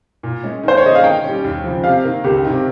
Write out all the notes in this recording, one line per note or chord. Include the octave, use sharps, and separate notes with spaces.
A#2
G#3 C#4
D#3 C5
C#5
A#3 C#4 G#4 D#5
F5
D#3 G5
G3 C#4
D#2
C#3 F3
C3 F5
D#3 A#3
C#2 G4
C3 D#3